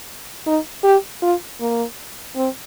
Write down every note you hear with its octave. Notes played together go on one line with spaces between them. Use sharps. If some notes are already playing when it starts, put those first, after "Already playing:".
D#4
G4
F4
A#3
C4